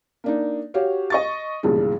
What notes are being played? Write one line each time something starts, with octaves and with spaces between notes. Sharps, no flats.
A#3 D4 D#4
F#4 G4 C#5 F5
D#5 C#6 A6
B1 G2 A#2 C#3 E3 G#3